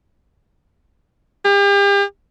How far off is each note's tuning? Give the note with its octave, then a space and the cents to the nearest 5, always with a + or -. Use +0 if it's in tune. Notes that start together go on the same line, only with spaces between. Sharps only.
G4 +40